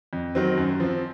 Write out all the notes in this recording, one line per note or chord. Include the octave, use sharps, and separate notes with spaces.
F2
D#3 F#3 C4
F#2
F3 C4